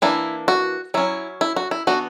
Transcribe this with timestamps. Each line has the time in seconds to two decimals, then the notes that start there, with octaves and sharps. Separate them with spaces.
0.02 E3 A#3 D4 E4
0.48 F#4
0.94 F#3 C#4 E4
1.41 E4
1.56 F#4
1.71 E4
1.87 E3 B3 D4 F#4